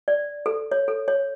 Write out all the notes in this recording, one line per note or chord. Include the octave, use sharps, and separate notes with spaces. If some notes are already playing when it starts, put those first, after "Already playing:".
D5
A4
C#5
A4
C#5